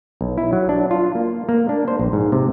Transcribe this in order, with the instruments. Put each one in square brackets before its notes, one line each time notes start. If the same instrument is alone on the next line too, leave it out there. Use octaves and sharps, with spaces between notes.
[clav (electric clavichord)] B1
E4
F#3
D4
F4
A#3
A#3
D4
C5
A#1
G#2
C3